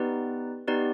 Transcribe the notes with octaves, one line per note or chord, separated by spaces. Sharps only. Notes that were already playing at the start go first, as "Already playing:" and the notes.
Already playing: B3 D#4 G4 B4 D5
B3 D#4 G4 B4 D5